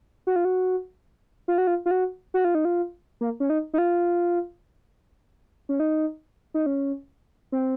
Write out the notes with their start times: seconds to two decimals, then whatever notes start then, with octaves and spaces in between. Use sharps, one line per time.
0.27 F#4
0.36 F4
0.45 F#4
1.48 F4
1.58 F#4
1.67 F4
1.86 F4
1.91 F#4
2.34 F#4
2.45 F4
2.55 D#4
2.65 F4
3.21 A#3
3.40 C#4
3.50 D#4
3.74 D#4
3.78 F4
5.69 C#4
5.80 D#4
6.54 D#4
6.66 C#4
7.52 C4